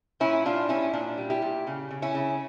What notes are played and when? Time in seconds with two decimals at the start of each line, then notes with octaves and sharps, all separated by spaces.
0.20 A#2 C#4 E4
0.45 G3 D4 F4
0.69 A#2 C#4 E4
0.93 A#2 D4
1.17 G3
1.30 E4 G4
1.42 A#2
1.67 C#3
1.91 C#3
2.02 C#4 E4
2.15 C#3